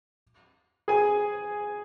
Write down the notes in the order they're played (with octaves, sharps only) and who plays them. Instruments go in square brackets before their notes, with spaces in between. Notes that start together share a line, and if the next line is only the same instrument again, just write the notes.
[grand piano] G#4 G#5